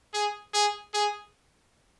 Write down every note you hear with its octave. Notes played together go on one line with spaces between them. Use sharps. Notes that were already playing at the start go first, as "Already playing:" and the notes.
G#4
G#4
G#4